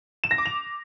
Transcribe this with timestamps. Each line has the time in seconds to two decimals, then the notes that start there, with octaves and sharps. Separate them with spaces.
0.24 E7
0.31 A#6
0.38 D6
0.46 F7